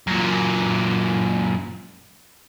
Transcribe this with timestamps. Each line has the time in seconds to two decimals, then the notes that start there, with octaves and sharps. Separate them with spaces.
0.07 F#2 A#2